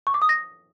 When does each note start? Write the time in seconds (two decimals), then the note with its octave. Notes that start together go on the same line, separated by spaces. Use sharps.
0.07 C#6
0.14 D6
0.22 D#6
0.29 A#6